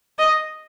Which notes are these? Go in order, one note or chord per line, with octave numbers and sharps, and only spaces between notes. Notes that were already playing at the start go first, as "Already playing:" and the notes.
D#5